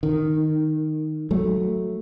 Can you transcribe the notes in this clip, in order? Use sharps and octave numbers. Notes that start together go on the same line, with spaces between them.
D#3
F#3 A3